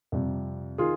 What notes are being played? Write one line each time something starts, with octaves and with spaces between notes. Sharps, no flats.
F2 C3 G3
D#3 F4 G#4